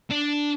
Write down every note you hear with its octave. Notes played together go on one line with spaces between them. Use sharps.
D4